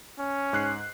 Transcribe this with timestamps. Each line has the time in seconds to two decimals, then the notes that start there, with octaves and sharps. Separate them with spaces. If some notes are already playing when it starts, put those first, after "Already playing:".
0.19 C#4
0.53 G#2 F#6 C7